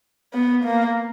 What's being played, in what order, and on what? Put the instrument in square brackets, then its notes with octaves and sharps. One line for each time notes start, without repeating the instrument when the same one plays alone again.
[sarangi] B3
A#3